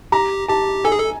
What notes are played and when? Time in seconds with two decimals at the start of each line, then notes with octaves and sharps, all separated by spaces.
0.12 G4 A#5
0.48 G4 A5
0.84 A4 G#5
0.92 G#4
0.99 A4